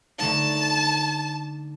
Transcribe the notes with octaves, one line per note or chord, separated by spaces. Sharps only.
D3 A3 D#4 A5